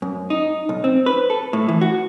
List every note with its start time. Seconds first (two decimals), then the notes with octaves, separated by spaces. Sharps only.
0.02 F#2
0.30 D#4
0.69 B1
0.84 C4
1.06 B4
1.30 A4
1.53 A2
1.68 E3
1.81 F#4